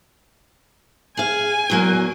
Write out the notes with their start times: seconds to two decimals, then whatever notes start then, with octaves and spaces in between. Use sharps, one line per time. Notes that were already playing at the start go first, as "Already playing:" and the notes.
1.17 G#4 F5 G#5
1.70 E2 F#3 A#3